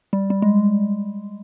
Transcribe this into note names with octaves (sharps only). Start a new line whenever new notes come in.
G3
G3
G#3